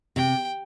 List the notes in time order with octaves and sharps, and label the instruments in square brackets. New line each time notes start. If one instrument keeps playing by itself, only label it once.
[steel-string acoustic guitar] C3 [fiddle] G5